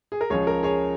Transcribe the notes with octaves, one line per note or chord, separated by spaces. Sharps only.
G#4
A#4
C#2 C#3 F3 G#4 C#5
A#4
G#4 C#5